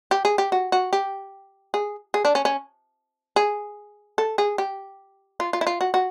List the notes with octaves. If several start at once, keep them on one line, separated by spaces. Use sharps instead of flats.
G4
G#4
G4
F#4
F#4
G4
G#4
G#4
D4
C#4
C#4
G#4
A4
G#4
G4
F4
F4
E4
F4
F#4
F#4